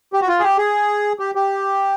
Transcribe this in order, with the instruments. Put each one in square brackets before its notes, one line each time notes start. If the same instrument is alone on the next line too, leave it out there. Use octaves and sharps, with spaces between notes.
[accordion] G4
F#4
F4
G#4
G4
G#4
G4
G4